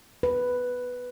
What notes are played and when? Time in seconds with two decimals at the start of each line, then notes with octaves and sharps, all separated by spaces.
0.23 B4